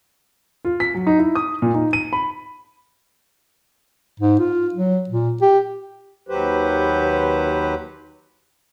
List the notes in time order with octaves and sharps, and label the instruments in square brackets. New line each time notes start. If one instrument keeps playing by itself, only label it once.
[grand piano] F4
B6
F#3
D#4
E4
D#6
A#2
D#4
D#7
B5
[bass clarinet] G#2
F4
F#3
A#2
G4
[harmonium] D#2 F#3 G4 B4 C5